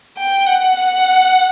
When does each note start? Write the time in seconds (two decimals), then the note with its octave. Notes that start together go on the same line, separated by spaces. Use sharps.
0.17 G5
0.46 F#5
0.76 F#5